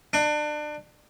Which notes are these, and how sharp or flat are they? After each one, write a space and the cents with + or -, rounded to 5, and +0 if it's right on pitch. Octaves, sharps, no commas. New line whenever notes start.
D4 +30